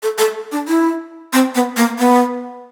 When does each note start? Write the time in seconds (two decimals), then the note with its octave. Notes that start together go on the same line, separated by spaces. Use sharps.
0.03 A4
0.18 A4
0.52 D4
0.68 E4
1.33 C4
1.55 B3
1.77 A#3
1.99 B3